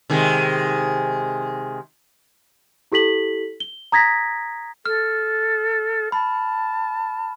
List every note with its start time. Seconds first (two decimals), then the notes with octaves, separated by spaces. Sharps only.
0.10 C3 D#3 G#3
2.92 E4 G4 A4 B6 F#7
3.60 G7
3.92 A#5 D#6 G#6 A#6 B6
4.86 A4 F6
6.12 A5 B5